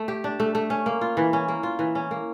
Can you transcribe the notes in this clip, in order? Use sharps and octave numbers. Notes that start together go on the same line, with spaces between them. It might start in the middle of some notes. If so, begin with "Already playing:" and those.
Already playing: A3
G4
D4
A3
A3
C#4
A#3
F4
E3
C#4
A#3
F4
E3
C#4
A#3